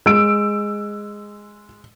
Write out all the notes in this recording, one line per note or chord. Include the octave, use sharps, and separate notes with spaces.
G#3 E6 D7